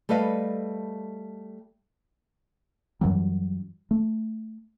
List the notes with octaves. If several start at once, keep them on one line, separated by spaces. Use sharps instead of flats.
G3 A3 A4 B4 D#5 F5
F#2 E3 F#3 G3
A3